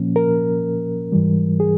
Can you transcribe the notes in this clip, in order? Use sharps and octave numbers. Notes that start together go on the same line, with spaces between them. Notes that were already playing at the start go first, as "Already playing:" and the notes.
Already playing: A#2 F3 A#3 C#4
A#4
G#2 E3 G3
G#4